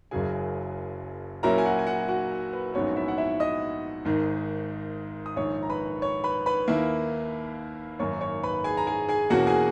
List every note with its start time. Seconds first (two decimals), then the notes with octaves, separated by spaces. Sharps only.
0.11 F#1 F#2 C#3 F#3 G#4 G#5
1.43 A#2 F#3 C#4 E4 A#4 A#5
1.58 G#5
1.64 F#4 F#5
1.79 G#5
1.87 F#4 F#5
2.08 F#4 F#5
2.53 B4
2.74 A#1 G#2 F#3 B3 C#4 C#5
2.96 E4 E5
3.08 F#5
3.18 E4 E5
3.40 D#5 D#6
4.05 G#1 G#2 D#3
5.26 D#6
5.36 A#1 G#2 D#3 C#5 C#6
5.63 A#5
5.70 B4 B5
6.02 C#5 C#6
6.24 B4 B5
6.46 B4 B5
6.68 D#2 D#3 A#3 E4
7.99 G#1 F#2 D#3 A#3 C#5 C#6
8.21 C#5 C#6
8.43 B4 B5
8.64 G#4 G#5
8.77 A#5
8.87 G#4 G#5
9.09 G#4 G#5
9.30 E2 B2 A#3 C#4 F#4 F#5
9.47 G#4 G#5